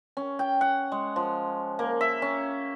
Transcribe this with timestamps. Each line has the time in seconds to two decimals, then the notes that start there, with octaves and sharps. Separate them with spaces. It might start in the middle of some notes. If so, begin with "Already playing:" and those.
0.17 C#4
0.39 G5
0.61 F#5
0.92 G#3
1.16 F3
1.79 A#3
2.01 E5
2.22 C#4